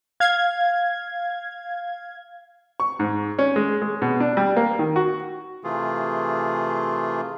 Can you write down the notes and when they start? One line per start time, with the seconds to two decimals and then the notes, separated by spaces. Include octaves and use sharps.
0.20 F5 G#6
2.80 C#6
2.99 G#2
3.38 C#4
3.56 G#3
3.82 G#3
4.02 B2
4.20 D4
4.37 G3
4.56 A#3
4.79 D#3
4.96 F#4
5.64 C3 E3 A3 F4 G#4